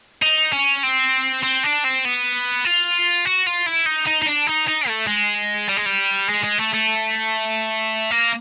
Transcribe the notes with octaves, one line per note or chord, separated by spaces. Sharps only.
D#4
C#4
C4
C4
D4
C4
B3
F4
F#4
F4
E4
D#4
D#4
D#4
D4
D#4
D#4
A3
G#3
G3
G#3
G3
G#3
G#3
A3
A3
A#3